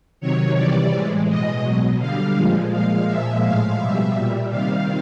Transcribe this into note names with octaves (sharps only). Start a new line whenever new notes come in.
C3 D#3 F#3 C#5
C3 E3 G3 D5
A2 E3 G#3
B2 G#3 D#5
B2 F#3
D3 G3 F5
A#2 F3 G#3
A#2 F3 G#3 F5
A#2 F3 G#3 E5
A2 F3 G#3 F5
B2 G3 E5
A#2 G3
C3 D#3 G3 F5